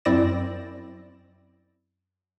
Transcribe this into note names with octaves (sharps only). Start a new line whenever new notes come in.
F#2 C4 E4 D5 A#6 E7